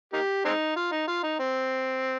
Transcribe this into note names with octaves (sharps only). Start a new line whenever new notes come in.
A#3 D#4 G4
G#3 C4 D#4
F4
D#4
F4
D#4
C4